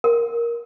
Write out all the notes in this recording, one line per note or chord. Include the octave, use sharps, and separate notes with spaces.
A#4